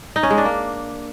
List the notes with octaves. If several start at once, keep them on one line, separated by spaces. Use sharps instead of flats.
D#4
C#4
G#3
D4
A#3